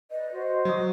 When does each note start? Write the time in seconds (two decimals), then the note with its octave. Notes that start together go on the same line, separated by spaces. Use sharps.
0.11 B4 D5 D#5
0.32 F#4 C5
0.65 F#3 D#6